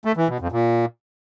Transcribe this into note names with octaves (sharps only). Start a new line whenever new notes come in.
A3
E3
B2
F2
A#2